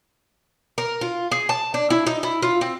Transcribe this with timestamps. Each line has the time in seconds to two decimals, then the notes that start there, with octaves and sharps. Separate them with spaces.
0.78 A#4
1.01 F4
1.31 G#4
1.49 A5
1.74 D4
1.90 E4
2.06 D#4
2.23 E4
2.42 F4
2.61 C4